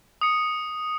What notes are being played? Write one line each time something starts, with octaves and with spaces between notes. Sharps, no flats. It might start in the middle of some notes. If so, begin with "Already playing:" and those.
D#6 C#7